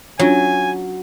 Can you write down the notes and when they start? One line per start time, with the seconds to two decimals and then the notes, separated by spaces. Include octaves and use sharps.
0.19 F#3 C#4 D4 F4 G#5